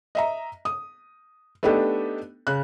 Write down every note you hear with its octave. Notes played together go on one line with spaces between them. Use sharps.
D#5 E5 A#5
D#6
A3 B3 D4 D#4 G4 A4
C#3 F#6